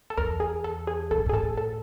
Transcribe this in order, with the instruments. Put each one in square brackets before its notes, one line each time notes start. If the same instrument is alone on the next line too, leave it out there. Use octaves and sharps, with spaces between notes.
[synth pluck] A4
[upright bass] E2 [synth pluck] A#4
[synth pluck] G#4
A4
G#4
[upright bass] A#2 [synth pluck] A4
[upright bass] A2
G#2
[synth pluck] G#4
[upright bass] A2 [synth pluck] A4
[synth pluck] A4